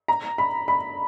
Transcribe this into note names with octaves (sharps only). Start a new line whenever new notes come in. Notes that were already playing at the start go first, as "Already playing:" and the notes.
A#5
B5
B5